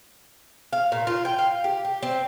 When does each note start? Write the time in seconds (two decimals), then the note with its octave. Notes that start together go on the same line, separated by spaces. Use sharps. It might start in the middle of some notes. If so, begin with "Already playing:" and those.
0.73 F5
0.92 A#2
1.07 F4
1.25 G5
1.38 F5
1.64 G4
1.85 G4
2.03 C4